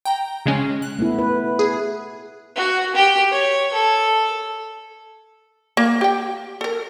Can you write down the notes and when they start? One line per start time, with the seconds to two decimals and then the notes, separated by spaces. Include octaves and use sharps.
0.05 G5 A#5
0.46 C#3 G#3 C#4
0.82 F#6
0.99 A3 B3 E4
1.18 B4
1.59 G#4
2.55 F#4
2.95 G4
3.31 C#5
3.73 A4
5.77 A#3
6.01 G4 G5
6.61 A4 A#4